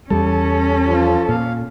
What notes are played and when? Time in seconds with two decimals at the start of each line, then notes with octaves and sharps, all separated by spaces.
0.10 E2 G3 C#4 A4
0.87 F3 F4
1.29 A#2 F5